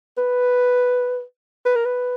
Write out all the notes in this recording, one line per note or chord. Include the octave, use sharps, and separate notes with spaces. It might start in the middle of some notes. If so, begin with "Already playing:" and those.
B4
B4
A#4
B4